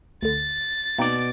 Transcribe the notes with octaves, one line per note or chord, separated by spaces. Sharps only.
D2 D3 A6
B2 A#3 C4 D#4 D5